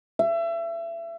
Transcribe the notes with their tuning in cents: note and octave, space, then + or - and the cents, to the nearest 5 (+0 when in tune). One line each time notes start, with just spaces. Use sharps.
E5 +30